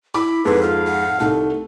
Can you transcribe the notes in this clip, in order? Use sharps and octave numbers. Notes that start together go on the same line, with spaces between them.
E4 B5 D6
F2 G#2 E4 B4
F4 F5
F#5
C2 A3 D#4